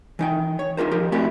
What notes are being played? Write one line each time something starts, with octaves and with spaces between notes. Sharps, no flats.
E3 D#4 G5
C#5
D#4 F4 A#4 C5
F3 G4 A#4
A3 C4 E4 F#4 G4 D5